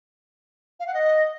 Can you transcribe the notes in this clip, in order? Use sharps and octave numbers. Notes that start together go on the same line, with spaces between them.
F5
F#5
D#5